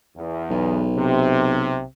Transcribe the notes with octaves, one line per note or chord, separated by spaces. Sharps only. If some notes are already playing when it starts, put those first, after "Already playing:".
E2
B1
C3